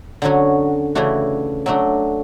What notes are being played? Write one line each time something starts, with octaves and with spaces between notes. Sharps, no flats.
D3 F#3 C#4 F#4
C#3 E3 A3 D4 F#4
F#3 A3 D4 F#4